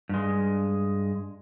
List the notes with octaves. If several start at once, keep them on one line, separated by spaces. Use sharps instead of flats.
G2 G#3